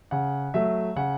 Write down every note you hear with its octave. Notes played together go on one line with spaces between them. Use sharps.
C#3 F#5
F#3 A3 E5
C#3 F#5